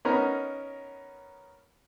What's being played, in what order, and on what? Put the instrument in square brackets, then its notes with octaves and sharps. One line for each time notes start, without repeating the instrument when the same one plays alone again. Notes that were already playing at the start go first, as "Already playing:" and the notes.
[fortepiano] B3 C#4 D#4 A#4